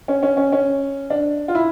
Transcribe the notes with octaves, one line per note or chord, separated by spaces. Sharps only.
C#4
C#4
C#4
C#4
D4
F4
E4